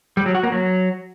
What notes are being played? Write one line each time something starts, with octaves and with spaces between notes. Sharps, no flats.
G3
F#3
F#4
A#3
F#3